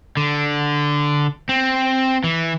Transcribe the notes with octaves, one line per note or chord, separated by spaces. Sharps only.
D3
C4
E3